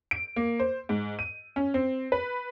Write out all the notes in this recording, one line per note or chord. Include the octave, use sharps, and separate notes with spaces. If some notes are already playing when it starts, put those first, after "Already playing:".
D7
A#3
C5
G#2
D#7
C#4
C4
B4